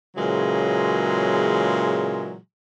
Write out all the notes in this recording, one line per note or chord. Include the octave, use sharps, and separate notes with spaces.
A#2 C#3 E3 F#3 G#3